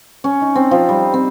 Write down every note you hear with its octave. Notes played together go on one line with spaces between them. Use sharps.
C#4
D#4
C4
F3
G3
C4